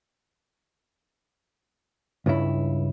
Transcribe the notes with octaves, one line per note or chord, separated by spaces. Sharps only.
C#2 G2 C#3 E4